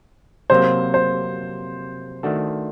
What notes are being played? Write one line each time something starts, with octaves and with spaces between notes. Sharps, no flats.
C3 F#3 A#3 C5
C5
D#3 A3 D4 F#4 A4